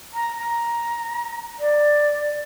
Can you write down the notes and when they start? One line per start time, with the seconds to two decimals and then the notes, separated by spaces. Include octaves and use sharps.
0.14 A#5
0.37 A#5
1.60 D5